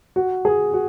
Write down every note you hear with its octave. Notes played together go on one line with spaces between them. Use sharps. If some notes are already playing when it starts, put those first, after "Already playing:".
F#4
G#4
F#4